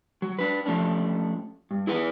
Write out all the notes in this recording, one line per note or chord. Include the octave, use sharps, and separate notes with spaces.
F#3
D4 B4
F3 A3 C#4 D4
G2
E4 G#4 B4 F5 F#5